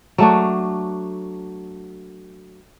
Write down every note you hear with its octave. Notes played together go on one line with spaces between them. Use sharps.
F#3 A3 D4